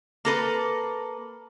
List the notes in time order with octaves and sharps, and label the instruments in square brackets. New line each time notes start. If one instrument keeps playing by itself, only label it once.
[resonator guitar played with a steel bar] A#3 A4 B4